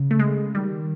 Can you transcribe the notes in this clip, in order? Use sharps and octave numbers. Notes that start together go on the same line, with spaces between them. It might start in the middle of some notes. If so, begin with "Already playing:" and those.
Already playing: C#3
A3
G#3
D#3 G3